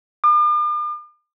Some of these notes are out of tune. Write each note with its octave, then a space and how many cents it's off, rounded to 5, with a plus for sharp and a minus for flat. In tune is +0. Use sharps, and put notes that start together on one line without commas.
D6 +45